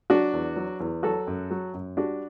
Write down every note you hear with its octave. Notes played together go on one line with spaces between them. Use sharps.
F#3 D4 F#4
E2
F#3
E2
F#3 F#4 A4
F#2
F#3
F#2
G3 D4 F#4